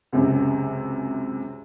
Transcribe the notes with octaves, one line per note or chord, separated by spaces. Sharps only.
C#2 F#2 C3